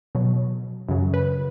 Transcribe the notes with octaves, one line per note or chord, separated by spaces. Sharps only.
B2 F#3
F#2 C#3 F#3
B4